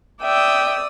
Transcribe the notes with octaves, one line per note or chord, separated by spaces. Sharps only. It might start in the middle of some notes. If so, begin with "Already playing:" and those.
D5 E5 G5 D#6 E6